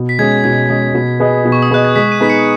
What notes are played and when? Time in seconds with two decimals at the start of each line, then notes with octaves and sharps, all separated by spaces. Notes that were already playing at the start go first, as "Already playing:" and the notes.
Already playing: B2
0.09 B6
0.19 G#3 C#4 G#4 G#6
0.44 B2 G#6
0.69 G#3 C#4 G#4
0.95 B2
1.20 B3 G#4 D#5
1.45 B2
1.52 C#6
1.62 D#6
1.71 B3 G#4 D#5 F#6
1.85 G#6
1.96 G#3 B6
2.12 D#7
2.20 B3 D#4 G#4 B6
2.30 C#7